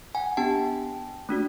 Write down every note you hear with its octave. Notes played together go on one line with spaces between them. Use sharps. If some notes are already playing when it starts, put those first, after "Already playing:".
F#5 G#5
B3 D4 G4 G5 A5
A3 D4 F#4